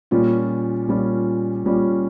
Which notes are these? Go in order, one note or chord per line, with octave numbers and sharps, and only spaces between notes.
A#2 G3 C#4 F4
A#2 G3 C#4 F4
A#2 G3 C#4 F4